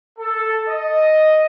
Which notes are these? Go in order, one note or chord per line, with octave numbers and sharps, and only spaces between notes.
A4
D#5